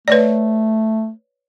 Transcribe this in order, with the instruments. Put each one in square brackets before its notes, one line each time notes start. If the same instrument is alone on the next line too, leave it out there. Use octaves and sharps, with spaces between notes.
[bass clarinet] A3 [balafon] B4 C#5 D5